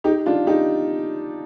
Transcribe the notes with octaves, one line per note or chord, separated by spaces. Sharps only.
D#4 G4
D4 F4
D#4 G4